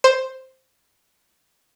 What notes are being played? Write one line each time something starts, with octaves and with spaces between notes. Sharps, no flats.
C5 E7